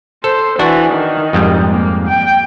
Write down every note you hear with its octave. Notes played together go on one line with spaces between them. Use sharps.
A4 C5
E3 D4 F#4
D#3
F2 G#2 G3
A#3
G5